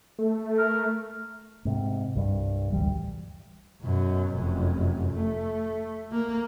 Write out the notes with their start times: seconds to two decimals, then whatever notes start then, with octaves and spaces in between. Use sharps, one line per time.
0.19 A3
0.58 A#4
1.65 G#2 C3
2.15 C2 G2
2.72 A1 D2 E3 G3
3.82 F#2 B2
4.35 F1 F#2
5.13 A3
6.12 A#3